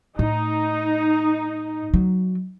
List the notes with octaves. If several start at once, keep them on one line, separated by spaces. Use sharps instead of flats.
A2 D#4
F#3